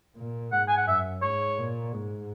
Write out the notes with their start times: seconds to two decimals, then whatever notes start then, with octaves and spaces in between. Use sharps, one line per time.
0.17 A#2
0.52 G#2 F#5
0.68 G#5
0.77 F#5
0.87 F#2 E5
1.22 G#2 C#5
1.58 A#2
1.93 G#2